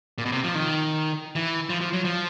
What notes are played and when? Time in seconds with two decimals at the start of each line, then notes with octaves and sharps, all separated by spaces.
0.18 A#2
0.25 B2
0.32 C3
0.44 F3
0.55 D#3
1.35 E3
1.70 F3
1.81 F3
1.93 F#3
2.05 F3